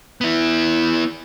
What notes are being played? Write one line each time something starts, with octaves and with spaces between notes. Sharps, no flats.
B3 E4